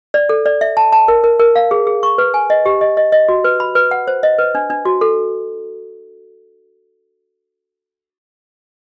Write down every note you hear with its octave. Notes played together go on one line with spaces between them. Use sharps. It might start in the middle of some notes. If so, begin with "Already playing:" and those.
D5
A4
D5
E5
A5
A5
A#4
A#4
A#4
F5
G#4
G#4
C#6
B4
G#5
D#5
G4
D#5
D#5
D#5
F#4
B4
B5
B4
F#5
C5
D#5
B4
D4
D4
F#4
A4